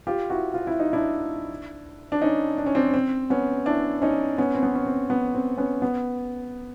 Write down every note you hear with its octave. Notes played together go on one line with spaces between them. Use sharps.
F4 G4
E4 F#4
F4
E4
D#4
D4 E4
D4
C#4 D#4
D4
C#4
C4 D4
C4
B3 C#4
D4 E4
C#4 D#4
B3 C#4
C4
B3
C#4
C4
B3
C4
B3 C#4
B3